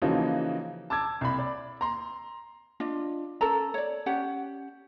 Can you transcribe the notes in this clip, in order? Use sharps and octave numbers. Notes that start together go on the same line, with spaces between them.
C#3 E3 F3 A#3 D#4 F#4
A5 D6 E6 G#6
C2 B5
D5
A#5 C6
D4 F4 D#5
C#4 A4 A#4 A#5
C#5 D5
C#4 G4 F#5